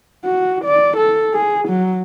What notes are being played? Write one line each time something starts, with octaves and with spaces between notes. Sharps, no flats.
F#4
D5
A4
G#4
F#3